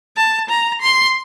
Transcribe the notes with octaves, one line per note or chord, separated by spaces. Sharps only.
A5
A#5
C6